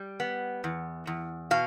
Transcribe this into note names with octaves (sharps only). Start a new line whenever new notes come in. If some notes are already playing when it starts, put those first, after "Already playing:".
Already playing: G3
B3
E2
E2
B2 F5